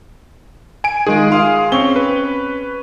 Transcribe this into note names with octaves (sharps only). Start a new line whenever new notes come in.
G#5 D7
D#3 G#3 F4 G#4
F5 C6
C4 C#4 C#6 G7
B4